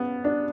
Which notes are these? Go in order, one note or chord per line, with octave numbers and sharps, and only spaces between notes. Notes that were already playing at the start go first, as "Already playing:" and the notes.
Already playing: C#3 B3
D4